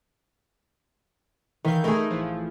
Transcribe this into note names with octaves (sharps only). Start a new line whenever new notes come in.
D#3 E3 E5 F5 G6
A3 D#4 G#4 A#4 B5
A1 E3 F3